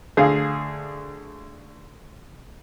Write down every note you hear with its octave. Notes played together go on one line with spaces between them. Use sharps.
D2 G#4 F5